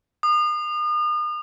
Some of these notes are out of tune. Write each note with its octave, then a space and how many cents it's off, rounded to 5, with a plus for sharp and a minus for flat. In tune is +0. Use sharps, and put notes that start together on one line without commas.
D#6 -40